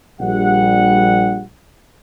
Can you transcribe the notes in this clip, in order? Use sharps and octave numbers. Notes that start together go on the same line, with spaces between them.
A#1 G3 F#5